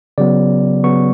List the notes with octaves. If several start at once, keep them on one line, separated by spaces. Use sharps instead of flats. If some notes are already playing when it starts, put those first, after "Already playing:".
C#3 F#3 B3 D5
C#3 F#3 B3 C#6